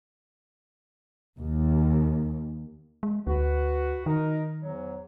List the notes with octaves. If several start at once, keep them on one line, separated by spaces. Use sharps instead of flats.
D#2
G#3
D2 F#4 B4
D#3 D#4 A#4
E2 G#2 F#3